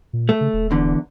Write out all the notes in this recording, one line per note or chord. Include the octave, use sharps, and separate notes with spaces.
A#2
A3
C#3
D#1
E2 D3